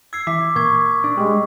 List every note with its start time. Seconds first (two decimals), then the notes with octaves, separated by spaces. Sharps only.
0.13 E6 G#6 C7
0.27 E3 D6 B6
0.56 A#2 C#6 G#6
1.04 D4
1.17 G3 G#3